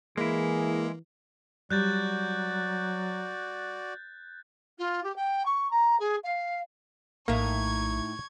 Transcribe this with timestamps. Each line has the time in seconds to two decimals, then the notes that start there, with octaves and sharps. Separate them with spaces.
0.17 E3 G#3 A#3 E4 G#4
1.70 F#3 G3 F#4 D5 F#6 G6 A6
4.78 F4
5.03 G4
5.15 G5
5.45 C#6
5.71 A#5
5.99 G#4
6.23 F5
7.28 A#1 A2 A#3 D#4 E5 C#6 G#6